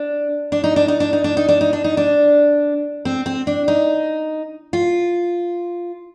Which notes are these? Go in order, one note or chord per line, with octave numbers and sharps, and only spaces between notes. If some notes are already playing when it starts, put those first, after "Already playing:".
Already playing: D4
D4
D#4
D4
D#4
D4
D#4
D4
D#4
D4
D#4
D4
D#4
D4
C4
C4
D4
D#4
F4